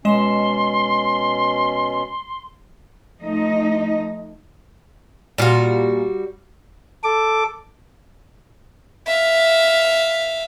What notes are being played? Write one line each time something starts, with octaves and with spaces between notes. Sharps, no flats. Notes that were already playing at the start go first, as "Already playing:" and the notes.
B2 G#3 C#4 D#5 C6 E7
F3 A3 D#4 D#5
A#2 G3 F4 F#4
A4 D6
E5 F5